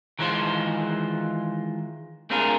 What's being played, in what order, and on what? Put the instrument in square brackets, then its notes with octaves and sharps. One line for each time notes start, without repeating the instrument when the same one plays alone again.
[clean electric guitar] D#3 E3 G#3 F4 C5
A3 C4 D4 F4 G#4 A#4